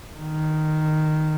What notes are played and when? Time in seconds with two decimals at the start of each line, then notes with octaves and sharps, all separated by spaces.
0.18 D#3